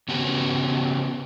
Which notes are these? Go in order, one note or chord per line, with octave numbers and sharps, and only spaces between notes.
C#3 B3 C#4 F#4 G4 B4